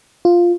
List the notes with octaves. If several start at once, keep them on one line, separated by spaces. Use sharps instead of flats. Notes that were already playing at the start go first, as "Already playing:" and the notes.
F4